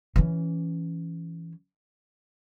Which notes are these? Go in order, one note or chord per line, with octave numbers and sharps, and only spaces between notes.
E3 C#4